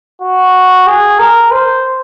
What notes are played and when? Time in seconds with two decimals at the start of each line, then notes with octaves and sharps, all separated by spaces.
0.22 F#4
0.87 G#4
1.19 A#4
1.51 C5